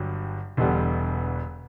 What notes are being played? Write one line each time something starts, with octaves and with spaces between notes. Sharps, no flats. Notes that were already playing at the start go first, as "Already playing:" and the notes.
Already playing: G1 G2 F#3
E1 E2 D3 G3 B3